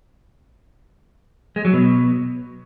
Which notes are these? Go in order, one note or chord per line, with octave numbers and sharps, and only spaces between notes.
G#3
F#3
B2